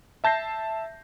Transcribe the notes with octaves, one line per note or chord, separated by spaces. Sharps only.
E5 A5 G6 A#6 C7